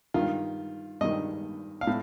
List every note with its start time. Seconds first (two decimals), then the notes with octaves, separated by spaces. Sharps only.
0.14 G2 D#3 F4
1.01 G2 D#3 D#5
1.81 F5
1.87 A2